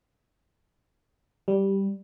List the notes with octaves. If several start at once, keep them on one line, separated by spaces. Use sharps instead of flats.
G3